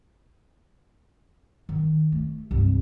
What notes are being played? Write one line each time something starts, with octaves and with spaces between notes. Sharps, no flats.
D#3
A3
C2 G2